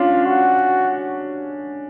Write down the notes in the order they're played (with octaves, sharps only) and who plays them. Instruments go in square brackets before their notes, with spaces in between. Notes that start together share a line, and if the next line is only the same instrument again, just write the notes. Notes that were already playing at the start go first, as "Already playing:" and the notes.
Already playing: [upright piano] C#4 D4 [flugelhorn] F4
[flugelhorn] F#4